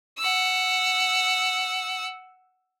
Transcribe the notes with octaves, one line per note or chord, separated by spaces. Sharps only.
F#5 E6